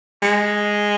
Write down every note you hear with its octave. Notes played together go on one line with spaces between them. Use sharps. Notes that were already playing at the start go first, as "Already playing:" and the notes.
G#3